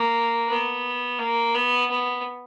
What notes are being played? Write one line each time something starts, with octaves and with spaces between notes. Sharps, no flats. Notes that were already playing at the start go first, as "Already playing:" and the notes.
Already playing: A#3
B3
A#3
B3
B3